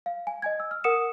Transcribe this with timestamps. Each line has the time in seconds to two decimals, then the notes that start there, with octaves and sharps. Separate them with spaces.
0.06 F5
0.27 G#5
0.42 D#5 G#5 G#6
0.60 E6
0.71 F6
0.84 A#4 F#5 D#6 C#7 E7